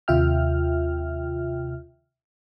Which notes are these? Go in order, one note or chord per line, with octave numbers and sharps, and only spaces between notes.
D#2 C3 F4 E5 G5 F6